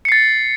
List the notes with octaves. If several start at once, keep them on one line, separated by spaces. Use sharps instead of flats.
A6 C7 C#7